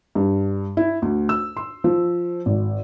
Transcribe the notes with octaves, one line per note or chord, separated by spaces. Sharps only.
G2
E4
D2
E6
C6
F3
G#1